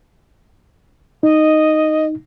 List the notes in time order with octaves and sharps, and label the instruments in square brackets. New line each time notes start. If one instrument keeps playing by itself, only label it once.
[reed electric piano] D#4 [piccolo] D#5